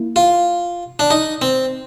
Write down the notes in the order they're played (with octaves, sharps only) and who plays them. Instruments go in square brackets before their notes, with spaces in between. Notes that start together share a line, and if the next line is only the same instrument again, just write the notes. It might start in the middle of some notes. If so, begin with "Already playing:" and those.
Already playing: [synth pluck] A#3 E4
[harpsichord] F4
D4
D#4
C4